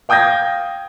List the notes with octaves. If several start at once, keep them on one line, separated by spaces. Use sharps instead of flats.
F5 G5 D#6 G6 G#6 A#6